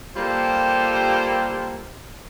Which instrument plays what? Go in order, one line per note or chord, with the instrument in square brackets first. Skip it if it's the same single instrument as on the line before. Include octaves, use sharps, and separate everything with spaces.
[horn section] G3 A#3 F4 G4 A4 C5